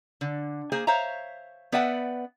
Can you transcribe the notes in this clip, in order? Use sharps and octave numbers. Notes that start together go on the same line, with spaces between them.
D3
A#3 G#4 C5 G#5
C5 C#5 E5 F5 A#5
B3 B4 D5 E5 F#5 G5